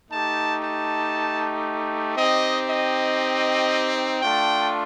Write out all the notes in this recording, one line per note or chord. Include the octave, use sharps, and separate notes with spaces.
A3 D#4 G4 A5
A5
C4 D#4 G4 D#5
D#5
A3 D4 F4 G5